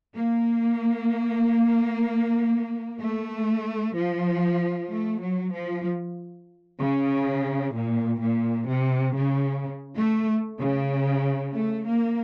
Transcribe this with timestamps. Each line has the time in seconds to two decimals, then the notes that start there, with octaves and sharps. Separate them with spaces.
0.15 A#3
3.00 A3
3.95 F3
4.90 A3
5.21 F#3
5.53 F3
6.79 C#3
7.75 A#2
8.22 A#2
8.68 C3
9.16 C#3
9.95 A3
10.59 C#3
11.53 A3
11.86 A#3